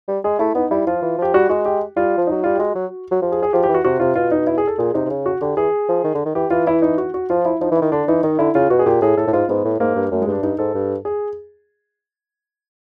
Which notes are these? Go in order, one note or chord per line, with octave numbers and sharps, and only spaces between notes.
G3
G#3 G#4
A3 E4
B3 D#4
G3 E4
F3 F4
E3
F3 G4
G3 F#4
G#3 F#4
G4
G3 F4
F3
F#3 D#4
G3 F4
G4
G#3 F#4
F#3
F#3
F3 G4
G#4
G#4
F3 G4
G4
E3
F#4
C3 F#4
C3 F4
B2 F4
D#4
E4
G#4
A4
A#2 G#4
C3 D#4
C3
C#3
F#4
D3 G4
E3 G#4
F3
D#3
D3
D#3
E3 G4
E3 F4
E4
D#4
F#4
F#4
F3 F4
E4
F3 D#4
E3
D#3 E4
D3 D4
E3 D#4
D#3 D#4
D3 E4
C#3 F4
B2 F#4
G#4
A#2 G4
A2 G#4
A2 A4
A2
G#2 F4
G#2 B3
A2
G#2 A#3
G2
F#2 A3
G#3
G2 D4
G2 D#4
G#2 A4
G2
G#4